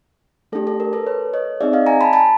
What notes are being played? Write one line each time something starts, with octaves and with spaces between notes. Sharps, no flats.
A3 D4 G4 A4
A4
A#4
A4 B4
B4 C#5
C#5 D#5
C4 D#4 G#4 D5 E5
D#5 F5
G#5 A#5
A5 B5
A5 B5